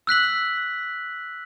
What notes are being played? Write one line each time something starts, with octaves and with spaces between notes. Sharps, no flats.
E6 F#6 B6 F#7